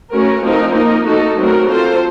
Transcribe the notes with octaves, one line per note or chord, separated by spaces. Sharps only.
A3 C#4 F#4 A#4
F3 A3 C4 D#4 A#4
A#3 D#4 A#4
A3 D#4 F#4 A4
F#3 A3 C4 F#4 A#4
C4 F4 A4 C5